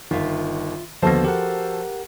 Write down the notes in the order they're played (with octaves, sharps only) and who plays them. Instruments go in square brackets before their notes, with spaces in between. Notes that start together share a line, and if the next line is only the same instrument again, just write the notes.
[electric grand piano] G1 D#3 [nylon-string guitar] F4 E5 F5
[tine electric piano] D#2 D3 B3 [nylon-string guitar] F3 F#4 A5 [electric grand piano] A4 C5
[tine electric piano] G4 A#4 F#5